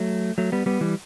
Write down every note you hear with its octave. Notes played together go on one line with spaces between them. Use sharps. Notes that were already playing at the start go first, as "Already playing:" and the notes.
Already playing: F#3 A3
F#3 A3
G3 B3
G3 B3
E3 G3